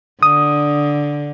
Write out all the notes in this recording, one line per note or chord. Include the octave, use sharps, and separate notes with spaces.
D3 D#6